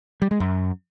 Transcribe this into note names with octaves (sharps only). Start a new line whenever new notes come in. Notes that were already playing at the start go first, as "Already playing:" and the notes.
G3
G#3
F#2